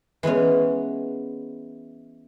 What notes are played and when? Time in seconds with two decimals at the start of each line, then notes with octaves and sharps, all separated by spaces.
0.23 E3 G#3 B3 C#4